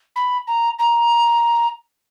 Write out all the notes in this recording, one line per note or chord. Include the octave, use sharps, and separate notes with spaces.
B5
A#5
A#5